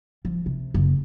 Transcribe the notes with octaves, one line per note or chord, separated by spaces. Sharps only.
F3
C3
F#1